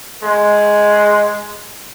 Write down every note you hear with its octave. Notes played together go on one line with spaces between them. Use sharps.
G#3